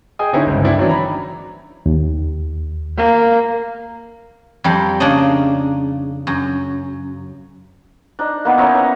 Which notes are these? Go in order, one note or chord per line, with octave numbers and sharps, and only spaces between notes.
G#4 D#5 G5 G#5 D#6
D3 C4 D#4 E4 C5 C#5
G1 C#2
C4 D4 E4
D#3 E3 F#3 C#4 D4
A#5 B5
D#2
A#3
F2 G3 A#4 C6
C#3 A#3 D4 D5 D#5
F#2
D4 D#4 D#5
A#3 B3 D#4
C#4 D#4 E4 C#5
B4 D#5